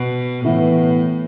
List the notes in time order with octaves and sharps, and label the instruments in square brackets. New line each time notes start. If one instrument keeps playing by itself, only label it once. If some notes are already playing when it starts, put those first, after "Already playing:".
Already playing: [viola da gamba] B2
[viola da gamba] A2 [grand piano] E3 B3 E4